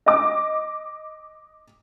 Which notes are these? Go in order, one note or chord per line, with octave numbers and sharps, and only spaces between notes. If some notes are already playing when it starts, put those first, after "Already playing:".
D#5 D6